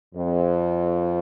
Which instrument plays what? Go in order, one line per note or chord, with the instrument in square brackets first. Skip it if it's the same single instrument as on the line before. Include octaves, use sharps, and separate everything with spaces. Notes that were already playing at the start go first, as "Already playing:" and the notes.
[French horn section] F2